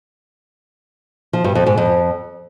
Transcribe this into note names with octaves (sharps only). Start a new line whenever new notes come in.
F3
G2
F2
G#2
F2